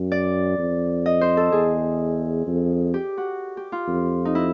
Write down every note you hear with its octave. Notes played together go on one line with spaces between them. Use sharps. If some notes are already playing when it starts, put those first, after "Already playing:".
Already playing: F#2
D5
F2
D#5
C5
A4
E2 G#4
F2
G4
F#4
G4
F4
F2
D#4
E4